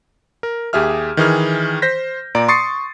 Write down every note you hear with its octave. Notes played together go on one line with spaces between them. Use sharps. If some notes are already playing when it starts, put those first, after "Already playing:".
A#4
D#2 G4 G#4 E5 F6
D#3 E3 G#4 F6
C5 G6 A#6 B6
A#2 D5 A#5 D7
C6 C#6 D#6 A6 C7 C#7